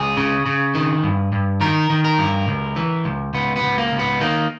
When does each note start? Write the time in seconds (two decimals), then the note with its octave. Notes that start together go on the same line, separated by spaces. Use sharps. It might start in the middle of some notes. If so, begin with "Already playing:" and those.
Already playing: C#2 G#4
0.17 C#3
0.46 C#3
0.75 D#3
1.04 G2
1.32 G2
1.61 D#3 A#4
1.90 D#3
2.05 A#4
2.18 G2
2.48 C#2
2.76 E3
3.05 C#2
3.34 C#2 B3
3.56 B3
3.63 C#2
3.78 A#3
3.92 C#2
3.99 B3
4.21 D#3 A#3